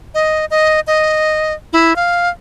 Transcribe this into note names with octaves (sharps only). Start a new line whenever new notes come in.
D#5
D#5
D#5
E4
F5